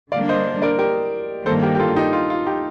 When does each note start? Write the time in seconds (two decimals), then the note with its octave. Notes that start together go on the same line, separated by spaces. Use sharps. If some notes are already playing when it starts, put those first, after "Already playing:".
0.12 D3 G3 A#3 D4 D5 F5
0.29 C5 D#5
0.62 A#4 D5
0.79 G4 A#4
1.46 G2 D#3 A#3 D4 A4 C5
1.63 G4 A#4
1.75 G4
1.80 F4 A4
1.96 D#4 G4
2.13 F4
2.30 F4
2.47 D#4 G4